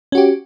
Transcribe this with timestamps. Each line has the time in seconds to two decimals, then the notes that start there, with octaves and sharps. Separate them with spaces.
0.12 C#4
0.15 F#4
0.17 G4